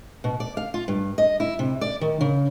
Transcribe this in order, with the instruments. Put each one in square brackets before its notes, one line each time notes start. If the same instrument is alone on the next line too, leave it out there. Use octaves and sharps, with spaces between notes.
[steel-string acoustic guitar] B2
D5
F5
F4
G2
D#5
E4
C3
D5
D#3
C#3